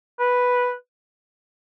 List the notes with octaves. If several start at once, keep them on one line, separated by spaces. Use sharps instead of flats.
B4